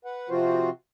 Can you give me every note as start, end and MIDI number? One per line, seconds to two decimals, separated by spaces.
0.05 0.29 71
0.05 0.29 78
0.30 0.70 48
0.30 0.70 53
0.30 0.70 60
0.30 0.70 65
0.30 0.70 66
0.30 0.70 72